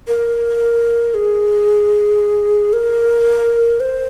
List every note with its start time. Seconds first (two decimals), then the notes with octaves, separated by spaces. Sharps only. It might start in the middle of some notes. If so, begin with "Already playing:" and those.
0.08 A#4
1.14 G#4
2.73 A#4
3.80 C5